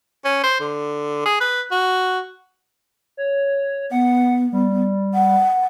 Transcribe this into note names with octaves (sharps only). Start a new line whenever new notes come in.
C#4
C5
D3
G#4
B4
F#4
C#5
B3 F#5
G3
F#5